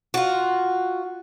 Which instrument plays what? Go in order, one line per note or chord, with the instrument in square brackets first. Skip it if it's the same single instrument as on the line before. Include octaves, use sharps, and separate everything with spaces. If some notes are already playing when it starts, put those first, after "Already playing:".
[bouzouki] F4 F#4